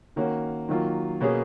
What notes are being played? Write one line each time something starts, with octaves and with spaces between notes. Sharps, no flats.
D#3 A#3 C#4 F#4
D#3 F#3 A#3 F4
B2 A#3 C#4 G#4